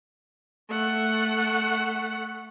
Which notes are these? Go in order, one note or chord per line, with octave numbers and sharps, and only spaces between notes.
A3 F#5